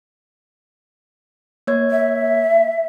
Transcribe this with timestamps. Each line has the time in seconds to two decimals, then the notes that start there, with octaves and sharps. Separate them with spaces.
1.67 A#3 C#5 G#6
1.91 E5